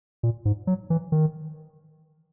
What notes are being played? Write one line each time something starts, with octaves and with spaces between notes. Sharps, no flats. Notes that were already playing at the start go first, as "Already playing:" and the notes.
A#2
G#2
F#3
E3
D#3